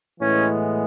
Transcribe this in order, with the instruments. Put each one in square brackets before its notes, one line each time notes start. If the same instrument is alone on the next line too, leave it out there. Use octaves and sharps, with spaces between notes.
[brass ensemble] A2 E3 G#3 B3 C#4